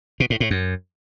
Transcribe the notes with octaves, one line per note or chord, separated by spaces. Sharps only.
B2
A2
A2
F#2